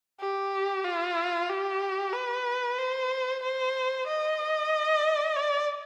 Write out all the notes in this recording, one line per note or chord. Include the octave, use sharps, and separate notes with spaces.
G4
F4
G4
B4
C5
C5
D#5
D5